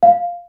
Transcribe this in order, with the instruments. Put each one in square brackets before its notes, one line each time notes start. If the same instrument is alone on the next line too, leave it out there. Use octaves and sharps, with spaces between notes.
[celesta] F5